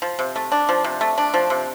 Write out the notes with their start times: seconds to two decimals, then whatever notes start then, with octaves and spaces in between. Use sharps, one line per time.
0.02 F3
0.19 C3
0.36 A3
0.52 D4
0.69 F3
0.84 C3
1.01 A3
1.18 D4
1.34 F3
1.50 C3